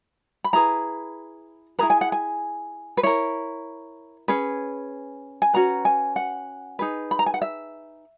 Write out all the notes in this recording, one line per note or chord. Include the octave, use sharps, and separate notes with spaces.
B5
E4 G#4 B4 A#5
E4 G#4 B4 A#5
G#5
F#5
G#5
B4
E4 A#4 C#5
C#4 G#4 B4
G#5
C#4 F#4 B4 A#5
G#5
F#5
D#4 G#4 B4
B5
A#5
G#5
F#5
E5